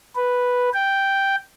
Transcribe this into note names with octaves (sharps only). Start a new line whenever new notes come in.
B4
G5